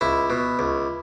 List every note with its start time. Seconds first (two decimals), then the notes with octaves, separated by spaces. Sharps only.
0.01 C#2 E4
0.30 B2
0.59 C#2